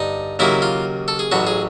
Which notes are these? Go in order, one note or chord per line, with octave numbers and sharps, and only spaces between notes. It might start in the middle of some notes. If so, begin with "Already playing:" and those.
Already playing: G2 D3 D#4
D#2 C#3 F#3 A#3 E4
F4
A4
G#4
A1 A2 F#3 F#4
G#4